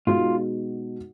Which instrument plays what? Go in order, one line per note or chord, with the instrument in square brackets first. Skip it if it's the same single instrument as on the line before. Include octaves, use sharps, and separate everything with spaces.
[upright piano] B2 G#3 D#4 F#4 [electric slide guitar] F4